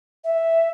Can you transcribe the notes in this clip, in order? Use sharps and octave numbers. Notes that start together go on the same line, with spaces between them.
E5